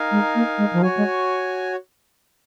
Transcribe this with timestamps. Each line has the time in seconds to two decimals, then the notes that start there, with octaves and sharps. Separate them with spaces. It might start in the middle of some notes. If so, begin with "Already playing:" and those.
Already playing: D#4 A#4 F5 G#5
0.11 G#3
0.35 A#3
0.58 G#3
0.73 F3
0.82 F#3 F#4 C#5 G#5
0.97 G#3